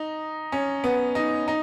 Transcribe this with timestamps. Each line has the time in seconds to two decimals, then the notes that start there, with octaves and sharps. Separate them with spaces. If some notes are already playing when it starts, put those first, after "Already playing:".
Already playing: D#4
0.52 C#4
0.84 B3
1.15 D#4
1.48 D#4